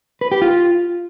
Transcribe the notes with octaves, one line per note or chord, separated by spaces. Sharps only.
B4
G4
F4